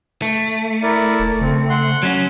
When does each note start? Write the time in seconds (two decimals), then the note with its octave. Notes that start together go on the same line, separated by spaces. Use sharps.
0.22 A3
0.83 E4 A#4 D5
1.19 E1
1.41 C#3 C4
1.70 F#5 C6
2.03 F#3 C#4